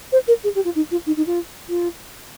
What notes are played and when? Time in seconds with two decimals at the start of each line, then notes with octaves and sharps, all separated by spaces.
0.12 C5
0.27 A#4
0.43 G#4
0.55 G4
0.64 F4
0.75 D#4
0.91 F4
1.06 D#4
1.17 D#4
1.26 F4
1.69 F4